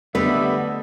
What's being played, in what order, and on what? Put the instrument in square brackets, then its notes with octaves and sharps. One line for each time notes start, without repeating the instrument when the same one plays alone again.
[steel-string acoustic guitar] D3 G3 B3 [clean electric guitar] A3 [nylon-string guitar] B4 [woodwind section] D#5 E5